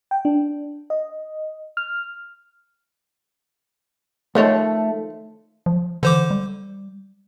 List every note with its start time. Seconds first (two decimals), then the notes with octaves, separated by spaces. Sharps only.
0.11 G5
0.25 D4
0.90 D#5
1.77 F6
4.35 D#3 F3 A3 C#5
5.66 F3
6.03 D3 E3 C5 D6
6.31 G3